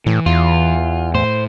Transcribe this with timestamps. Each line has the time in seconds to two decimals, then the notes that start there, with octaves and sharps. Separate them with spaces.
0.06 A2 E3
0.26 E2 F4
1.15 A2 C5